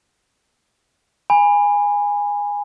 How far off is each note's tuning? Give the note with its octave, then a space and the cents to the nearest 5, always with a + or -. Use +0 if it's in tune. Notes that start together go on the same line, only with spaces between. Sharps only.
G#5 -15 B5 +0